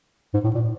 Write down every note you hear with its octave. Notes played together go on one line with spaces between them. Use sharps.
G#2
A2
A#2